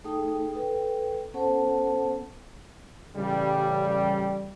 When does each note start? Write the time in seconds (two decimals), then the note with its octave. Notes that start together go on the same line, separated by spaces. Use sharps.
0.04 A3 D#4 G#4 A4 G5 D#6
0.54 A4 B4 G5
1.34 B3 C#4 A4 C5 F#5 A5
3.16 A1 C#3 G3